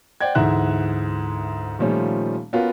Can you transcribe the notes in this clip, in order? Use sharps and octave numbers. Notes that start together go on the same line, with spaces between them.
C5 D5 F#5 G5 G#6
D2 G#2 E3 E5 F#5 F#6
A#2 D#3 F3 G3 A3 C#4
B3 C#4 F4 F#4 A#4 B4